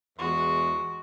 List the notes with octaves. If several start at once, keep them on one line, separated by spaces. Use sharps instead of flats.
E2 G#3 F#4